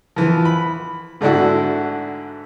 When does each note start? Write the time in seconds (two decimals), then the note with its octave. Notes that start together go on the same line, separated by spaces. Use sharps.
0.16 E3 F3
0.45 B5
1.21 G#2 D3 A3 D4 E4 F#4